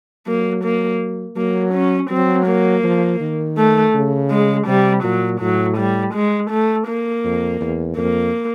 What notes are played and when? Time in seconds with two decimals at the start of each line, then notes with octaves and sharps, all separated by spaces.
0.27 F#3 A#3
0.64 A#3
1.37 F#3 A#3
1.74 C#4
2.10 F#3 C4
2.47 A#3
2.84 F3
3.20 D#3
3.58 A3
3.95 C#3
4.31 G#3
4.67 C3 G3
5.04 A#2 F#3
5.40 A2 F#3
5.78 G3
6.14 G#3
6.51 A3
6.88 A#3
7.25 F2
7.61 E2
7.97 F2 A#3